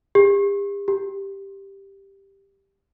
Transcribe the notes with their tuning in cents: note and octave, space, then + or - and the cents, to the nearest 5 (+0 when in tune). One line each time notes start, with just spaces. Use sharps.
G4 +40
G4 +5